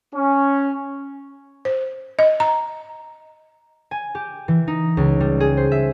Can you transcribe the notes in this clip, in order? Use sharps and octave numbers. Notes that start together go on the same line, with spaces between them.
C#4
C5
D#5
A#5
G#5
G4
E3
D#4
C#2
G3
G#4
C5
E5